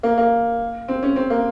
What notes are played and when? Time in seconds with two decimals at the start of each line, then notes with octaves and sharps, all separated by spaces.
0.03 A#3
0.18 A#3
0.88 C4
1.03 C#4
1.16 C4
1.30 A#3